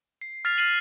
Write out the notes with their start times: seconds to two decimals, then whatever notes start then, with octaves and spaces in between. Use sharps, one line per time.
0.22 C7
0.45 F6 A6 B6 C7 F7
0.57 F6 A6 C7 D#7 F#7